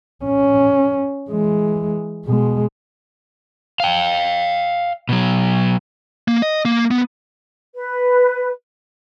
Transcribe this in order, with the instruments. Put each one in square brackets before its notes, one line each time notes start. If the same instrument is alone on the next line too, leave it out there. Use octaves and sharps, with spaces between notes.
[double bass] C#4
E3 G#3
B2 G#3
[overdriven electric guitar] F5 G5
B2 F#3
[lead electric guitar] A#3
D#5
A#3
B3
[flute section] B4